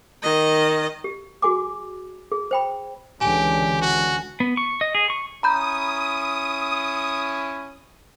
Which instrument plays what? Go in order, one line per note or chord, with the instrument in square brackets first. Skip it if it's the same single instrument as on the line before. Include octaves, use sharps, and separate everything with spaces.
[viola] D#3 D#5
[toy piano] G4
F#4 G#4 G#5 D6
G#4
C5 G5 B5
[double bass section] C#2 D3 E3 [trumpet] G4 [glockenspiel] G#5
[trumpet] F#4
[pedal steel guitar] B3
C#6
D#5
G#4
C#6
[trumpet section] C#4 E4 [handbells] A#5 B5 G6 [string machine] D#6